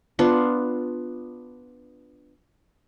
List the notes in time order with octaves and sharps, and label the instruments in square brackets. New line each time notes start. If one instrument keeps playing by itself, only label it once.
[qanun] B3 D4 F4